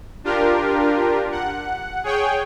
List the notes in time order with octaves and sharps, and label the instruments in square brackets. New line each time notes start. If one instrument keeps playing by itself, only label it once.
[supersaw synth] D4 F4 G4 A#4
F#5
G#4 C#5 G5